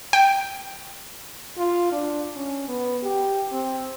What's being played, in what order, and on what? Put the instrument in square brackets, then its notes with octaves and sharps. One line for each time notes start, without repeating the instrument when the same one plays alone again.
[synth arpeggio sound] G5
[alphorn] F4
D4
C#4
B3
G4
C4